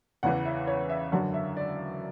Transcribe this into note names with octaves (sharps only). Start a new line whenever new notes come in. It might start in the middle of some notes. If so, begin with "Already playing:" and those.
E2 C#3 E3 F#5
E5
C#5
E5
F#2 D3 F#3 F#5
E5
D5